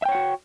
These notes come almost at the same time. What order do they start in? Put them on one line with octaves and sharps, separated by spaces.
E5 G5 C#5 F#5 F#4